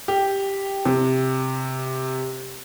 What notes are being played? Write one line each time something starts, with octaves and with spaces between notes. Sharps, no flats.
G4
C3